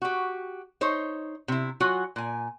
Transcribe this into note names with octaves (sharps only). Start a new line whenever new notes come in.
F#4 G4
D#4 C5 C#5
C3 E4
F#3 F4 F#4 G#5
A#2 G#5